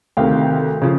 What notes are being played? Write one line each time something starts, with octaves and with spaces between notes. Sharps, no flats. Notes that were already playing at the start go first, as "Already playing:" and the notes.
D2 C3 D#3 F5 G5
C#3 F3